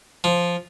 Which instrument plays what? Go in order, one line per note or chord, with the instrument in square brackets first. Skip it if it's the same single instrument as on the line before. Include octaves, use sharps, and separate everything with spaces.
[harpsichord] F3